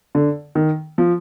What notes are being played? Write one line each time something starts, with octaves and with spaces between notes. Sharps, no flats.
D3
D#3
F3